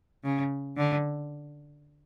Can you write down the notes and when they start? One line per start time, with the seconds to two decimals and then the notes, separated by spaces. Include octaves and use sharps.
0.24 C#3
0.77 D3